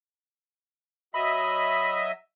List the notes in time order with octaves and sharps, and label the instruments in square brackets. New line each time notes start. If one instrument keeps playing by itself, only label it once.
[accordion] F#3 D#5 E5 [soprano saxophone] B5